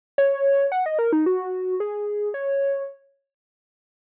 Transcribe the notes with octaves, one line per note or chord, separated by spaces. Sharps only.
C#5
F#5
D#5
A#4
D#4
F#4
G#4
C#5